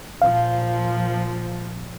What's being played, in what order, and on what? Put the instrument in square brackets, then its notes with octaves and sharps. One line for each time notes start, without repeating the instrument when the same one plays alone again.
[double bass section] A#2 F3 [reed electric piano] F5